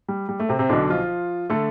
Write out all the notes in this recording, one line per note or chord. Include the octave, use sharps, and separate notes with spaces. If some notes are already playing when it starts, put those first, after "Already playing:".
G3
G3
A3
C3 C4
C3 C4
B1 B2 D3 D4
F3 F4
D3 A3 A4